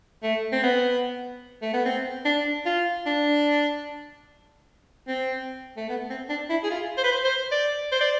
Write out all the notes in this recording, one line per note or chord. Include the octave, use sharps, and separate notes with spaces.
A3
C4
B3
A3
B3
C4
D4
F4
D4
C4
A3
B3
C4
D4
E4
G#4
F4
C5
B4
C5
C5
D5
C5
D5